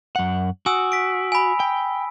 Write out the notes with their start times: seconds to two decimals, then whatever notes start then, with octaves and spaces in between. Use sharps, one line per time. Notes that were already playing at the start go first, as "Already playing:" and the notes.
0.16 F#2 F#5
0.66 F#4 G#5 D#6 E6
0.92 B6 D7
1.32 G#5 B5
1.60 G5